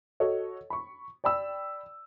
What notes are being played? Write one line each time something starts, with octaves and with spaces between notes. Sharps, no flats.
F#4 A4 C#5 D#5
B5 C#6
D5 G5 B5 E6